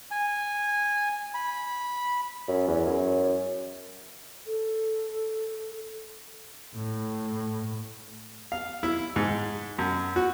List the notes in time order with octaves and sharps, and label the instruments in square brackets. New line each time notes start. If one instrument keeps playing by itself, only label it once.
[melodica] G#5
B5
[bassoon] F#2
E2
F#2
[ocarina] A4
[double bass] A2
[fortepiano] F5
E4
G#2
F#2
F#4